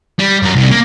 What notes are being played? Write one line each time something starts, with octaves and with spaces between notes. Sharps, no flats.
G3
F#2 A#4
C2
A#3